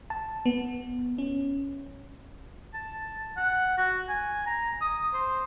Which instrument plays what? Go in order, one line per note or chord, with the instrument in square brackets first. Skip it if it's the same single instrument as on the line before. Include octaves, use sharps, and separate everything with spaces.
[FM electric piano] A5
B3
C#4
[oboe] A5
F#5
F#4
G#5
A#5
D#6
C5